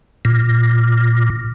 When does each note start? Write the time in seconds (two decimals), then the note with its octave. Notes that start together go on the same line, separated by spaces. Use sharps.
0.25 A#2